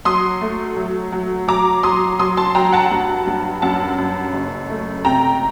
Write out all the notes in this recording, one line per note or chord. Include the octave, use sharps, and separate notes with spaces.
F#3 C6 D#6
A3
F#3
F#3
F#3 A#5 D6
F#3 C6 D#6
F#3 C6 D#6
A5 C6
F#3 G5 A#5
F#5 A5
G2
G2
F#2 F#5 A5
F#2
F#1
A3
C3 G5 A#5